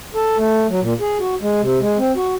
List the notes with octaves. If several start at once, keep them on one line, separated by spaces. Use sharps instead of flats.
A4
A3
F#3
A#2
G#4
F#4
G#3
C3
G#3
C4
F#4